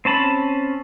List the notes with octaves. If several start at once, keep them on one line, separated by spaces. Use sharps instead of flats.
C4 C#4 A5 B5